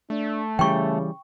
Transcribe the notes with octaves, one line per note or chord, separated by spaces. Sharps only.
A3 D4
C#3 E3 G3 G5 C#6